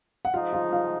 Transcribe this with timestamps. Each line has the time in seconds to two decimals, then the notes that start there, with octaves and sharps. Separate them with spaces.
0.25 F#5
0.33 F3 G#3 D#4 F4 F5
0.53 F4 F5
0.72 F4 F5